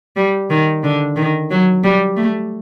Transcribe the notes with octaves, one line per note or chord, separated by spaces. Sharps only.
G3
D#3
D3
D#3
F#3
G3
A3